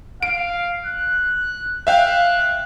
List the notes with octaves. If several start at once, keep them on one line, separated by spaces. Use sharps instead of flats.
F5 D7
F#6
E5 F5 G5 F#6